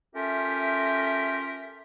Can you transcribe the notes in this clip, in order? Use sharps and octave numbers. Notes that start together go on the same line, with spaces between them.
A3 C#4 F4 G4 A#4 E5